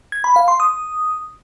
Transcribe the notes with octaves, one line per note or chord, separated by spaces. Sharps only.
G#6
B5
F5
C6
D#6